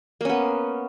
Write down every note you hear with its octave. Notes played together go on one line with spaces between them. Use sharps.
A#3 B3 C#4